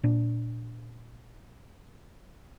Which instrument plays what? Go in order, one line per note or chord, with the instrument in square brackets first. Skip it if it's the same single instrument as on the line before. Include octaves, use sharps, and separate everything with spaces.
[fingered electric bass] A#2 D4